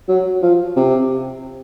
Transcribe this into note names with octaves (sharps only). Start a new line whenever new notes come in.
F#3
F3
C3